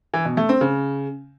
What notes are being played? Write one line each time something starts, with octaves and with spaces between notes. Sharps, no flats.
E3
B2
A3
C4
C#3